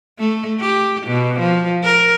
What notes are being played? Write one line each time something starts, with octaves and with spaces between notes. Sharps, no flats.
A3
G4
B2
F3
A#4